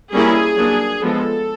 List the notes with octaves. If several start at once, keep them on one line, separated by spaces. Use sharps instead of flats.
G3 A#3 C#4 E4 G#4
F#3 A#3 D4
F3 G#3 B3 A4